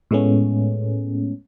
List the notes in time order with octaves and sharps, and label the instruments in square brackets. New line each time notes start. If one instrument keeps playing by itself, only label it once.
[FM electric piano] A2 G#3 A3 B3 C#4